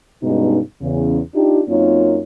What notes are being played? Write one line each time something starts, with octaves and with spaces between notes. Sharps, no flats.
G2 B2 G#3 C#4 D#4
E2 C#3
D4 D#4 F4 G4
F#2 A#3 C4 D#4 F4 C#5